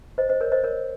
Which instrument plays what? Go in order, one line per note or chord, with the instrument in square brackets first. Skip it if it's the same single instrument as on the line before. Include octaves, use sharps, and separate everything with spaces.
[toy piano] C5 D#5
C5 D#5
A#4 C#5
C5 D#5
A#4 C#5